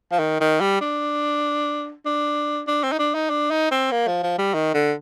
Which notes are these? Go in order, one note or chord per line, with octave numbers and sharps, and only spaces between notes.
F3
D#3
D#3
G3
D4
D4
D4
C4
D#4
D4
D#4
D4
D#4
C4
A#3
F3
F3
G3
D#3
D3